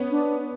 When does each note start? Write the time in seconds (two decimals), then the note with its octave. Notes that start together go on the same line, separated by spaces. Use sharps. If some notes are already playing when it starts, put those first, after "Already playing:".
Already playing: B3 C#4
0.11 D4